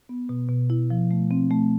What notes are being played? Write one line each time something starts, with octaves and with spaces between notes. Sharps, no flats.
B3
B2
B2
E4
F3
A3
C4
A3